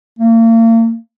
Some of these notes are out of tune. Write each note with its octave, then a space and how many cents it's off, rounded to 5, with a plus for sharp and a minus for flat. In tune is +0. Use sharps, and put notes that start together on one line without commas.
A#3 -40